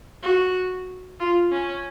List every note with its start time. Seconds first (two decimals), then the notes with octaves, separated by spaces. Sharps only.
0.22 F#4
1.20 F4
1.52 C#4